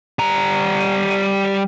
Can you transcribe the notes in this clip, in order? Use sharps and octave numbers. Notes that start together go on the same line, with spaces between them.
G3 A#5